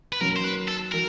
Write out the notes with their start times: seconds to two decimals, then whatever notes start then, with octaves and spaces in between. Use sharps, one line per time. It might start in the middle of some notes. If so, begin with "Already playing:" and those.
0.13 B4
0.21 F#2 D#3 F#3 A#3 C#4 A#4
0.36 C5
0.44 B4
0.68 A4
0.92 D#3 F#3 A#4